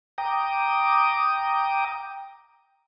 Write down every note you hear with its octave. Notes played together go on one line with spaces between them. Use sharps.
G5 A#5 D6 D#6